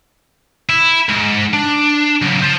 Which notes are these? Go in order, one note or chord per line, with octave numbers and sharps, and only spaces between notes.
E4
G#2
D4
C#2 F#2
C5 A5